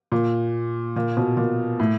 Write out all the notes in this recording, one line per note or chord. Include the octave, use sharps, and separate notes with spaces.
A#2
A#2
B2
A#2
A2